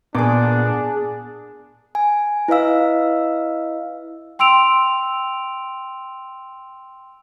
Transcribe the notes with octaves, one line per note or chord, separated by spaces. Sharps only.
A#2 B3 D4 G#4 D6
G#5
E4 B4 D#5 F5 E6
G5 C6 E6 D7 F7